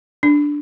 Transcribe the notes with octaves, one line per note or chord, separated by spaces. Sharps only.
D4